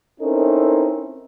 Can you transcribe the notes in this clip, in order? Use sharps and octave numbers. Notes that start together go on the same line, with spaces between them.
C4 C#4 D#4 E4 A4 A#4